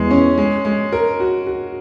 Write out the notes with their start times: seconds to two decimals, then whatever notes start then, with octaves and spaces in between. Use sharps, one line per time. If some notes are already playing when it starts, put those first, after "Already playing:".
Already playing: E2 G#3
0.11 C#4
0.38 G#3
0.65 G#3
0.92 A#4
1.20 F#4
1.47 F#4